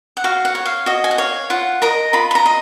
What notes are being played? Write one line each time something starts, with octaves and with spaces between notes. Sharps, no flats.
F#5
F#4 F5
F#5
C#5
F5
F#4 D#5
G#5
F#5
C#5 F5
F4 F#5
A#4 D#5 A#5
F4 B5
B5
A#5
D#5